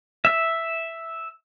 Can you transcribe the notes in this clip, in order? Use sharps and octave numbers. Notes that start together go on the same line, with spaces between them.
E5